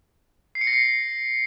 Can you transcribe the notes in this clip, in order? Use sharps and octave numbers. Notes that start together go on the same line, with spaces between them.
C7
C#7
A#6
C7